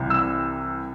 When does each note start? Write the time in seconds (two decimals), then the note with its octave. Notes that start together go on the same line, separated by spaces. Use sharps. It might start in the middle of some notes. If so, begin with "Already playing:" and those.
Already playing: C2 C3 E3
0.10 E6